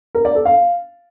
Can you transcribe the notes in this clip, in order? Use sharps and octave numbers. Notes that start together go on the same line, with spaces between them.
A#4
D5
A4
F5